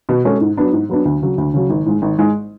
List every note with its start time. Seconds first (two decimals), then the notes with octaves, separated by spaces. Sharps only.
0.09 B2
0.25 G#3 C#4 F#4 A4
0.41 G#2
0.57 F#3 B3 D4
0.73 G#2
0.89 F#3 B3 D4
1.05 D2
1.22 C#3 F#3
1.38 D2
1.54 C#3 F#3
1.70 G#1
1.86 G#2 G#3
2.02 G#1
2.18 G#2 G#3